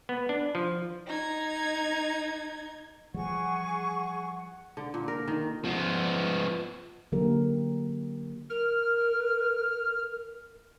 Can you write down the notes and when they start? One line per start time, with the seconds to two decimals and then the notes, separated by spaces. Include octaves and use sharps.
0.09 B3
0.29 D4
0.55 F3
1.07 D#4 G#6
3.14 E3 F3 G3 G#4 F#5 C#6
4.77 D3
4.94 A#2
5.08 A#4
5.28 D#3
5.65 F3 B3
7.12 D3 F#3 A#3 G4 A#4
8.50 A#4 F6